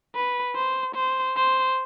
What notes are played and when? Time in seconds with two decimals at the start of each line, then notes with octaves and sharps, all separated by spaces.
0.15 B4
0.56 C5
0.95 C5
1.36 C5